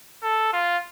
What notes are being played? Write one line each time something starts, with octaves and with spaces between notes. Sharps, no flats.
A4
F4